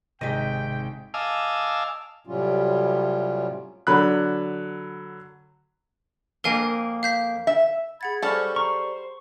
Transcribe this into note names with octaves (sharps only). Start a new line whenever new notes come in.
G#1 C3 G#3 D#4 D#5 G5 B6
D#5 F5 G#5 A5 D6 E6
A2 C3 F#3 G3 C#4 F4
D3 F#3 B5 F#6
F2 A#3 A#4 F5 G#5
F5 G6 B6
E5
G#4 F#5 B5 G#6 A6
G3 C#4 A4 C5 B5 C#6 F6 G6
C5 A#5 C#6